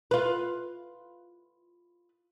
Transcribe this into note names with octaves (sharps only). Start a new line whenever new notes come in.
F4 B4